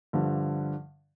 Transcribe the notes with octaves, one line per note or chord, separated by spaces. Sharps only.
G2 D3 F3